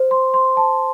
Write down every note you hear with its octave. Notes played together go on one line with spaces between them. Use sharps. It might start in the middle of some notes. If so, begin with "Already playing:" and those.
Already playing: C5
C6
C6
A5